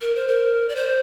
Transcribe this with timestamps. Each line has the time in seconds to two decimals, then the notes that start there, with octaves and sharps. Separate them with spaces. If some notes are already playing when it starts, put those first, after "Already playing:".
0.01 A#4
0.15 C5
0.28 A#4
0.69 D5
0.76 C5